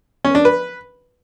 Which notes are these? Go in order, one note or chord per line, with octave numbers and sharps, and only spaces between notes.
C#4
D4
B4